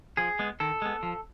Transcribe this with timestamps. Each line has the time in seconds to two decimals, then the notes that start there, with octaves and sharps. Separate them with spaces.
0.17 F3 G#4
0.39 G#3 B3
0.60 D#3 A4
0.82 G#3 B3
1.03 F3